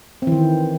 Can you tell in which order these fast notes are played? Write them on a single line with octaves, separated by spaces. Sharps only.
C4 E3 D#3